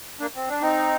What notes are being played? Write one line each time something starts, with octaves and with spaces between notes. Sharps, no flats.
A#3 D4
C4
D4
C4 D#4